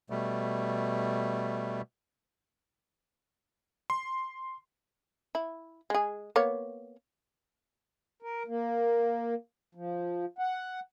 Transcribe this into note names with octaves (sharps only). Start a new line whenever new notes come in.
B2 G3 A3
C6
E4
G#3 G#4
A#3 B3 C#5
A#4
A#3
F3
F#5